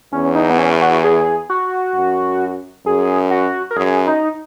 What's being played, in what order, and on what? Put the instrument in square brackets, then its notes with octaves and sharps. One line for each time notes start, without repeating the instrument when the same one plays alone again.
[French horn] E2 [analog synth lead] C#4
[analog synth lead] D#4
B3
C#4
F#4
G#4
F#4
[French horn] F#2
[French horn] F#2 [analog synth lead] G#4
[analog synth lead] F#4
A#4
[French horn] F#2 [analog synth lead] G#4
[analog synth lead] D#4